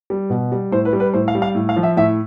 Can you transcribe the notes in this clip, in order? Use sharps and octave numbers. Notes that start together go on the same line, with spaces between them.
G3
B2
G3
A2 C5
B4
G3
B4
A2 C5
F5
G3
F5
A2
F5
F3
E5
A2 E5